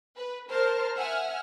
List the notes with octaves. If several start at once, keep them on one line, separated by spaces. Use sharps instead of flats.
B4
A#4 C5 A5 F6
E5 F#5 G#5 F6